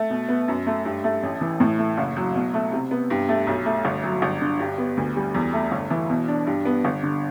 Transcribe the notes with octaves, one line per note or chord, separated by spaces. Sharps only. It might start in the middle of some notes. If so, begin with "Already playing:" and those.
Already playing: A3
B2
B3
F#2
A3
G2
A3
A1
E3
A2
A3
F#1
F#3
B2
A3
C3
B3
G2
A3
B1
A3
G1
F#3
G1
D3
G2
B3
D2
G3
E2
A3
G1
E3
B2
D4
G2
B3
G1
D3